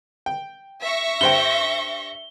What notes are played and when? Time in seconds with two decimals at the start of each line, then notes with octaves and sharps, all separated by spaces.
0.26 G5
0.83 E5 C#6 A#6
1.21 G2 C5 G5 G7